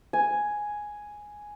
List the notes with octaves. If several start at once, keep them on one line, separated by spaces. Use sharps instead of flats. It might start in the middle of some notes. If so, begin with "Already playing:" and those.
G#5